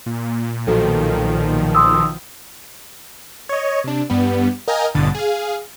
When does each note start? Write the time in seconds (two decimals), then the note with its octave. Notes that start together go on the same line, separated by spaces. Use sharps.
0.06 A#2
0.67 B1 D#3 F3 F#4 A4
1.75 C6 D#6 E6
3.49 C#5 D#5
3.84 C3 D4
4.10 G2 G3 B3
4.68 A#4 D#5 F5 G5 G#5 A#5
4.95 A1 G2 B2 D3 D#6 A6
5.15 G#4 F5